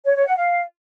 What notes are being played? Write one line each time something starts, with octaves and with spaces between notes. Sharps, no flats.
C#5
C#5
F#5
F5